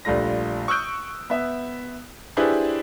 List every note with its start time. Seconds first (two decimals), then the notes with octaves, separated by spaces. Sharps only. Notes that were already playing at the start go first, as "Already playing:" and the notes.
0.05 A#1 G3 A3 F4 A#6
0.68 C#6 D#6 E6 F#6 G6 D7
1.30 B3 E5
2.37 D4 E4 G4 G#4 B4 C5